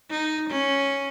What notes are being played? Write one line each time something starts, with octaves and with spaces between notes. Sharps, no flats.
D#4
C#4